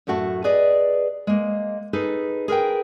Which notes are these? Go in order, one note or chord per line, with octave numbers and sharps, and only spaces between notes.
F#2 A2 A3 F#4 G5 A5
G#4 B4 D5 D#5
G#3 A#3
D#4 G#4 A4 B4
G#4 A#4 B4 G5